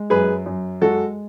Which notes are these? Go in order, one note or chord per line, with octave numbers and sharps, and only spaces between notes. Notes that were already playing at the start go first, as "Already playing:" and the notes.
Already playing: G#3
F#2 G#4 B4
F#2
G#3 F#4 A4